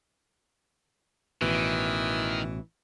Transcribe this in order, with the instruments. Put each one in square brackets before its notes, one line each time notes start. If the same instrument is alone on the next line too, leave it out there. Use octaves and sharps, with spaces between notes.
[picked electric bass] A1 B2 [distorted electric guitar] D#3 [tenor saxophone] E3